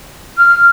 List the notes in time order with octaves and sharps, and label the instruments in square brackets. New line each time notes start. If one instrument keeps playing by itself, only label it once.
[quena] F6